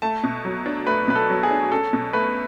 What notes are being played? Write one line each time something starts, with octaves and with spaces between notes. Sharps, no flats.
A3 A5
B2
F#3
D4
A3 B4
B2 B4
A4
F#3
G#4
D4
C#4 A4
B2
A3 B4